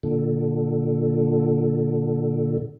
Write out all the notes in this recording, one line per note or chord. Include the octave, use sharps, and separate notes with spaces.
A#2 D3